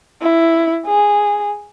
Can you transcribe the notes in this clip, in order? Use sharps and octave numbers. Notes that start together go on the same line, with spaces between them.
E4
G#4